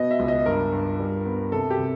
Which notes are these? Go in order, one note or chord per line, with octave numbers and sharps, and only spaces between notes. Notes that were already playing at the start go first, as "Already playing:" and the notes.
Already playing: B2 B3 D#5
E5
C#2
D#5
G2 A#4
G2
G3
B3
C3 A4
G4
C3